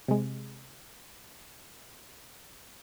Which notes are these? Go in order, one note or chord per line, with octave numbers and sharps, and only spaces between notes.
C3 G#3